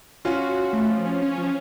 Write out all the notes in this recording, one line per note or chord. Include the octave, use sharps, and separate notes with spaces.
C#4 F4 F#4
F#4
F#4
A3
F3
C#4
C#4
F3